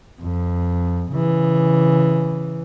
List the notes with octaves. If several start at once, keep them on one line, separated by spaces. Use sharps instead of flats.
F2
C#3 E3